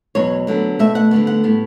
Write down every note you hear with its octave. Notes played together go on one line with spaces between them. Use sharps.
E2 B2 F#3 C#5
D2 D3 F#3 B3
B2 A3 E5
F#5
D2 D3 G3 B3
F#5
A2 G3 B3